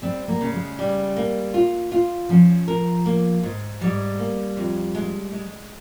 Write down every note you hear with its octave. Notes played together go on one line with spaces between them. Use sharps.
G3 C4
A#3
C#3
G#3
G3
A#3
F4
F4
F3 C#4
A#4
A#3
G#2
G#2 G3
A#3
F2
G#3
G#3